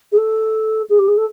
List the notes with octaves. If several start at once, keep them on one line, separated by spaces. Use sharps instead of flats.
G#4
A4
G#4
G4
G#4
A4